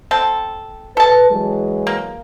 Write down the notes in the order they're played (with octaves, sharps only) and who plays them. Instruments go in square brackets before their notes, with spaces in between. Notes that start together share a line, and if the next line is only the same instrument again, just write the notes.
[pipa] C4 A4
[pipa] A4 A5 [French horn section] B4
[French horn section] E3 F#3 G#3
[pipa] A#3